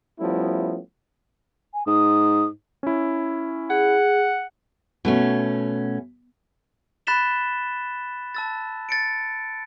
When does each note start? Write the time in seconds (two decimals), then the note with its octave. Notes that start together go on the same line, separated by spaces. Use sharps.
0.20 F3 G3 A3 B3 C#4 E4
1.74 G#5
1.87 G#2 D#6
2.83 C#4 E4
3.70 G#4 F#5
5.05 B2 A3 C#4
7.07 B5 F#6 A6 B6 E7 G7
8.35 A5 E6 A6
8.89 A6 C#7 D7